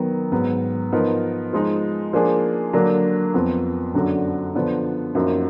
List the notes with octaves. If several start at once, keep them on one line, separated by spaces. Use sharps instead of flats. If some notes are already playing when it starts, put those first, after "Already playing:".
Already playing: D#3 F#3 B3
G#2 F#3 B3
F3 B3 D#4 A#4
F3 G#3 D#4
F3 A#3 D4 G#4
D3 F#3 A#3 D4
F2 F3 B3
F#2 D3 F#3 D4 F#4
D3 F3 B3 D4
F#2 F3 A#3 D#4 F#4